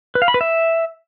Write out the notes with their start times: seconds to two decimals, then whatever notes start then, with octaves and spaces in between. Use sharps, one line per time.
0.15 B4
0.22 F5
0.28 B5
0.34 B4
0.41 E5